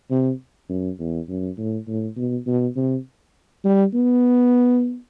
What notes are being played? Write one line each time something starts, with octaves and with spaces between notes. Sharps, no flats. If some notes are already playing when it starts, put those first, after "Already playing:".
C3
F#2
E2
F#2
A2
A2
B2
B2
C3
G3
B3